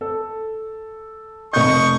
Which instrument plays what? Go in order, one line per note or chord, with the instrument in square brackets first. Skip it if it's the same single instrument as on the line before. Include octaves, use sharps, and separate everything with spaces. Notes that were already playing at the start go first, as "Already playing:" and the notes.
[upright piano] A4
[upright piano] F1 G6 [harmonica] D#5 C#6